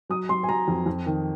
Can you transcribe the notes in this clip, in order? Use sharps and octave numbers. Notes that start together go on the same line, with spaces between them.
F#3 D#6
F#3 C6
G#5
F#3 A#5
F2
F2
D#3